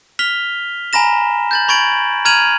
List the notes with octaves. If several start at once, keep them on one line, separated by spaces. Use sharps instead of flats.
F6 B6 F7 G7
G#5 A#5 B5 A#6 E7
G6 A6 F#7
B5 C#6 G#6 A6 D7 F#7
A#5 F6 G#6 D#7 F7 F#7